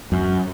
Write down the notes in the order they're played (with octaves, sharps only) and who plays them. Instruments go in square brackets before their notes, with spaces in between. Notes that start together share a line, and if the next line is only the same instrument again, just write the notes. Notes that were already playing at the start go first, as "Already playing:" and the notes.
[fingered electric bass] F#2